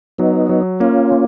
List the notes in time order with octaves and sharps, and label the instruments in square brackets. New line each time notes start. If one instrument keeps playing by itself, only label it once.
[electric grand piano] F#3 [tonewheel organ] B3 D#4
[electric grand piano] F#3
[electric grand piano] A#3 [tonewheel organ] C#4 F4
[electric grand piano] A#3